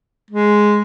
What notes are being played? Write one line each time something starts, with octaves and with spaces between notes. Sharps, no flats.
G#3